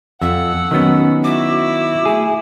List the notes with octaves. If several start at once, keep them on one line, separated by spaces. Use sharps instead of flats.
F2 F#5 E6
D#3 F#3 B3 C#4
E4 F#4 E5 D6
A3 G#4